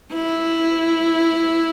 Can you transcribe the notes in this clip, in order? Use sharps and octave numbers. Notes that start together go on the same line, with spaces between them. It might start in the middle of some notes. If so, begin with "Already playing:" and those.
E4